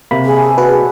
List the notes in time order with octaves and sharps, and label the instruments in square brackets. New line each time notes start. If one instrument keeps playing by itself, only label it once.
[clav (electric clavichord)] C3 A#3 [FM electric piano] B5
[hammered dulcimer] E3 G#3 D4 [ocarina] G#4
[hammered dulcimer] C#4 E4 A4
[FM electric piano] F#4 B4